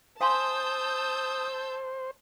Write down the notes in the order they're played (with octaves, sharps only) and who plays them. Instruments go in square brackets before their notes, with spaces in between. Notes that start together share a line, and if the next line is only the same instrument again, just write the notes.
[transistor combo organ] C5 [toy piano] F5 G#5 C6 [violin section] A5 E6 G6 [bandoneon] D#6